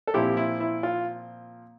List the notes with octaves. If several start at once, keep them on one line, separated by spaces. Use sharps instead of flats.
A4
A#2 F3 C4 E4 G4
E4
E4
F4